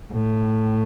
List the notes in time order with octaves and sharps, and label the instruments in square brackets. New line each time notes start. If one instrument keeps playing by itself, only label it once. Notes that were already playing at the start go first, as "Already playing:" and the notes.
[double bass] A2